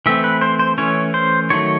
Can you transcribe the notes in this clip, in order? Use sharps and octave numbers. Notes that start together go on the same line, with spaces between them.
E3 A3 C4 E5
B4
C5
C5
E3 A3 C#4 C#5
C5
D#3 F#3 A3 C#5